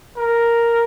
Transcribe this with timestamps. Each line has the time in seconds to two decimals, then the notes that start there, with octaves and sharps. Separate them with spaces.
0.17 A#4